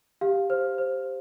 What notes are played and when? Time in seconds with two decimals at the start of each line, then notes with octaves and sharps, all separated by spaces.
0.21 G4 F5
0.50 C5
0.78 C5